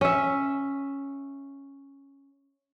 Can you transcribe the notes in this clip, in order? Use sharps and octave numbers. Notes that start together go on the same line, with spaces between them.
C#4 E5